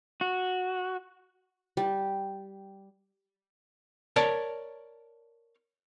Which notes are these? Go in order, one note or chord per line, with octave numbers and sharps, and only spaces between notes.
F#4
G3
A#4 C#5 D5 A5